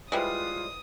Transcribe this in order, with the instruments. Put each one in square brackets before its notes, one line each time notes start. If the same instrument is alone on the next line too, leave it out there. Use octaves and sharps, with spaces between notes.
[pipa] G3 G#3 [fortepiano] E4 B4 C5 [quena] F4 [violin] D#6